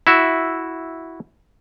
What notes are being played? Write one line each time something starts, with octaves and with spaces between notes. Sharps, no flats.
E4 F#4 E5